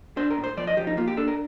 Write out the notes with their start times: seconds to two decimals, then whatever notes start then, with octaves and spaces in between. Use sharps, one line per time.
0.17 D4 C5
0.30 A#4
0.37 A2
0.44 C5
0.57 F3 D5
0.67 D#5
0.77 F3 G4
0.87 D#4
0.97 A#3 F4
1.08 G4
1.17 D4 A4
1.28 A#4